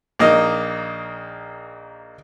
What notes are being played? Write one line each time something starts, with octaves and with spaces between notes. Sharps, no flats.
A#1 A#3 D#4 D#5